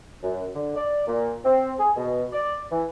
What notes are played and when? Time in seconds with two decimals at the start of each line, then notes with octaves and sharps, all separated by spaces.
0.23 F#2
0.55 D3
0.76 D5
1.07 A#2
1.45 C4
1.79 G#4
1.97 B2
2.33 D5
2.72 E3